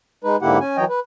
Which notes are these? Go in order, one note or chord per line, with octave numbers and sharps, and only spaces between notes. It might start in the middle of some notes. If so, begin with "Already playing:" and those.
G#3 D#4 B4
G#2 D3 A#3 E4 G4 F#5
C#4 G#5
E3 F#3 C#5 D#5 G5
B4